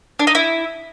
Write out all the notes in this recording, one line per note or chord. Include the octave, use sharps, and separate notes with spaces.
D4
D#4
E4